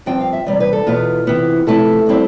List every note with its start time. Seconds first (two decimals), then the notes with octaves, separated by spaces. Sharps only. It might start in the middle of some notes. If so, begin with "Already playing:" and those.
0.06 G2 F3 C4 F4 G5
0.20 F5
0.33 E5
0.46 E2 C3 G3 D5
0.60 B4
0.73 A4
0.87 E2 B2 B3 F4
1.27 C3 E3 B3
1.67 C3 F3 A3 E4 A4
2.06 D3 G3 C4 E4